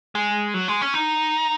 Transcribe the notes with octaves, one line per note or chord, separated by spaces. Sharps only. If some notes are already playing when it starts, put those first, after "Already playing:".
G#3
F#3
G#3
C#4
D#4